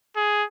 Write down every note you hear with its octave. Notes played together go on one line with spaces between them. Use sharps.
G#4